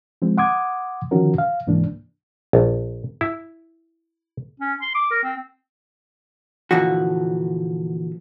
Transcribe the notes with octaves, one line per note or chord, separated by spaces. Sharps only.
F3 G#3 C4
F#5 C6 D6 D#6 G#6
D3 D#3 F3 C#4 F#4 A#4
F5
C2 G#2 E3 A#3 D4
A#1
E4
C#4
C6
D6
A#4
C4
A#2 D3 E3 F3 F#4